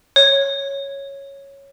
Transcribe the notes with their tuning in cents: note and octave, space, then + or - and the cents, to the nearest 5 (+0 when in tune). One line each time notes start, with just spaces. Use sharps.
C#5 -5